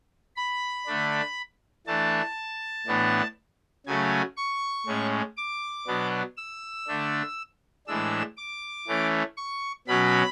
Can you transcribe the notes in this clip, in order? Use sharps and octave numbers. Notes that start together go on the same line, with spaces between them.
B5
D3 A3 D4
E3 A3 D4 A5
A2 E3 B3 D4
C#3 F#3 A3 C#4 G#5
C#6
A2 G#3 C#4
D6
B2 F#3 B3 D4
E6
D3 A3 D4
A2 E3 G#3 D4 E6
D6
E3 A3 C#4
C#6
B2 F#3 C#4 B5